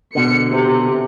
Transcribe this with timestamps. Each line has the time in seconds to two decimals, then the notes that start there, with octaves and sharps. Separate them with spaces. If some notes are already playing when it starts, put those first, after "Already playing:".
0.15 B2 D3 C#7
0.51 C3